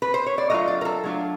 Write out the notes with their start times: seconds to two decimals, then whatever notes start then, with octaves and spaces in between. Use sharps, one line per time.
0.02 B4
0.14 C5
0.26 C#5
0.38 D5
0.50 F#3 A3 D4 F4 D#5
0.68 D5
0.81 A#4
0.85 A4
1.04 F#3 A3 D4 F4